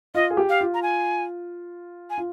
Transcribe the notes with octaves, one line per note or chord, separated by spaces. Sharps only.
F4 D#5
G#4
G4
F5
F4
A#5
G#5
G#5
F4